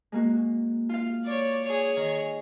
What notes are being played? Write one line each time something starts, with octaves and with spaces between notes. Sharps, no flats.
G#3 A#3 F#4
F4 F5
C#5 D5
G#4 C#5
D#3